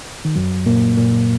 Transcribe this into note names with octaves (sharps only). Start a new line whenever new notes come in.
D#3
F#2 F#3
A#2 A#3
A#2 A#3